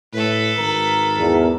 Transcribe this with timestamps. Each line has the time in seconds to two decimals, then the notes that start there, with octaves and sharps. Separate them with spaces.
0.13 A2 A4 B4
0.58 G#1 A#4
1.17 E2